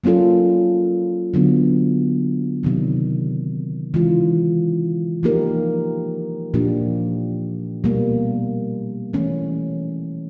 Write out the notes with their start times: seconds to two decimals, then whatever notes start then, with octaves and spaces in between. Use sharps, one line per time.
0.04 F#3 A#3 C#4 F4 A4
1.34 D3 F#3 B3
2.63 C3 D#3 F#3
3.94 C#3 E3 G#3 C#4 F4
5.23 F3 A#3 D#4 G4 A#4
6.54 A#2 F3 A#3 D4 G4
7.84 B2 G3 A#3
9.13 E3 A3 C#4